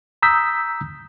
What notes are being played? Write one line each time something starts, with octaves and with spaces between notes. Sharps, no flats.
A#5 D#6 E6 G6 B6